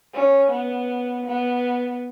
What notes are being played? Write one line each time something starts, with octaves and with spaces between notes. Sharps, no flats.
C#4
B3
B3